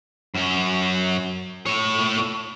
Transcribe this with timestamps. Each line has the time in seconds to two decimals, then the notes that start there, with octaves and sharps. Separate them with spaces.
0.35 F#2 C#4
1.66 A2 C#5